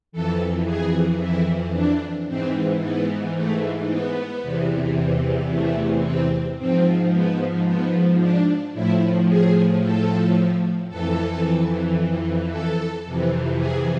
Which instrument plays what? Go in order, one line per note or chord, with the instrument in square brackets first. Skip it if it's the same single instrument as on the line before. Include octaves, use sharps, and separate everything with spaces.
[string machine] F2 E3 A4
G#4
E4
D4
G#2 E3 C4
B3
A3
B3
E2 C3 E3
A3
C4
G#2 F3 C4
B3
B3
D4
A2 F3 E4
G#4
A4
F2 E3 A4
A4
F2 C3 E3
G#4